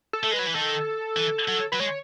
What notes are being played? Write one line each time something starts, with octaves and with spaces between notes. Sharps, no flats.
A4
A3
G#3 B4
F#3
E3
D#3 A4
E3
F#3
F#3 B4
G#3 C#5